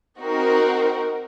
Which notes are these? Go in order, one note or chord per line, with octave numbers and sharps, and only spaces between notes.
C4 D#4 F#4 A#4